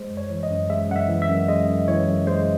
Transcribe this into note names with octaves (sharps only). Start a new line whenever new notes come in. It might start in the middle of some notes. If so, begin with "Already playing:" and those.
Already playing: G#3 C5
F#2
C#5
E3
D#5
F#2
G#3 E5
F#2 F#5
E5
E3
E5
F#2
G#3 D#5
F#2
E3 C#5
F#2
G#3 C5